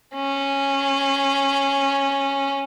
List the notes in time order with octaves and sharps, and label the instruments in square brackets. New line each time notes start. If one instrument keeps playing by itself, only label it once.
[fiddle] C#4